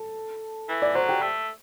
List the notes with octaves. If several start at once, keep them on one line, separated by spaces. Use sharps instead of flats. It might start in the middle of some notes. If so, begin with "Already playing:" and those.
Already playing: A4
E3
D5
F#3 C5
G4
A3